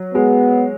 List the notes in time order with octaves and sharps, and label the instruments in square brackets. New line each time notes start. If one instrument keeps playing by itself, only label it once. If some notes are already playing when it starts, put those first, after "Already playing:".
Already playing: [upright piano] F#3
[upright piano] G#3 [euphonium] B3